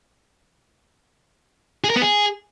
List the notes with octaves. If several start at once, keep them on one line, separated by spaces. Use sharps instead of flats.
G#4
A#4
B3
G#4